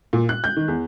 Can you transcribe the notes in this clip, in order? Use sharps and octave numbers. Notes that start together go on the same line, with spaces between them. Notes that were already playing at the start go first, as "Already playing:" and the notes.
A#2
F#6
G6
D#3
E2